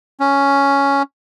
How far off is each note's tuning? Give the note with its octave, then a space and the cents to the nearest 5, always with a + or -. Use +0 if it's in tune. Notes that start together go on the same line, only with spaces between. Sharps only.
C#4 +5